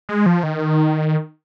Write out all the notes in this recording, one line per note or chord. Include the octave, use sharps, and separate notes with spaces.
G#3
F3
D#3